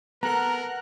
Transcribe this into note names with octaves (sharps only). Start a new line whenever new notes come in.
B3 A4 A#4 F#5 A#5 F#6